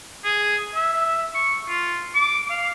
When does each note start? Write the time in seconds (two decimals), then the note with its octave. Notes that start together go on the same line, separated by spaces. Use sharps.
0.24 G#4
0.75 E5
1.35 C#6
1.68 F4
2.15 D6
2.50 F5